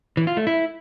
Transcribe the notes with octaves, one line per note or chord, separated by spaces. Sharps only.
E3
F4
A3
E4